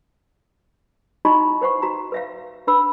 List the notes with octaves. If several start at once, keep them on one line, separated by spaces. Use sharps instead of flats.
D#4 E4 F#4 D#5 B5 C#6
B4 C5 F#5 C#6
F#4 A#5
B4 E5 F5
D4 B4 B5 E6